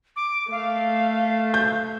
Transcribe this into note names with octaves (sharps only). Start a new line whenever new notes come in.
D6
A3 F5
G6